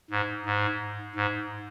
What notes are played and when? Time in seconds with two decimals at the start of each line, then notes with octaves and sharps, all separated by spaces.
0.11 G#2
0.45 G#2
1.16 G#2